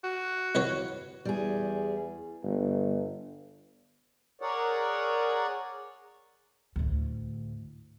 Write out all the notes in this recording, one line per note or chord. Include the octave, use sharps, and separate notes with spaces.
F#4
C2 B4 C#5
E2 G3 G#4
G1
G#4 A#4 C#5 D5 F#5
D2 A2